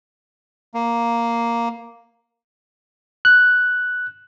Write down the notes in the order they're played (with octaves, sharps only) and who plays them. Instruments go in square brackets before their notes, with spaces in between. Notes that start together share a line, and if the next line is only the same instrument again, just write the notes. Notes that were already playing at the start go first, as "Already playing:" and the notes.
[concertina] A#3
[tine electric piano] F#6